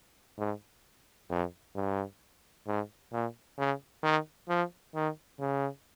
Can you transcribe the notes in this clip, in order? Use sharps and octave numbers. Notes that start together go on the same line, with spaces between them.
G#2
F2
G2
G#2
A#2
C#3
D#3
F3
D#3
C#3